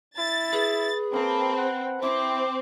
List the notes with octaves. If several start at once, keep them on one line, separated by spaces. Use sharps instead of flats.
E4 A6
G#4 B4
A#3 C4 A5 B5
F#5
C4 E4 C6 D6